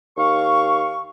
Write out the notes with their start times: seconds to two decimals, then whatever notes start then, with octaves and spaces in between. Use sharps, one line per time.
0.17 D#2 F5 C#6